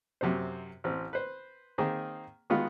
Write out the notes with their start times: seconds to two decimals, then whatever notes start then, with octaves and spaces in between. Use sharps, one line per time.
0.21 F#2 C3 C4 C5
0.84 A1 C4
1.13 B4 C5
1.78 D#3 A#3 C4 G#4
2.50 D#3 G#3 B3 F4 F#4